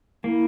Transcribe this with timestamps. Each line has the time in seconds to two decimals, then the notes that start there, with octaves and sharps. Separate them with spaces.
0.24 A#3 E4